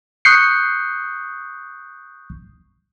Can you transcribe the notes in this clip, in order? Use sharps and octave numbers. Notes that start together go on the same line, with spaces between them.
C#6 D#6 F#6 G6 C7 C#7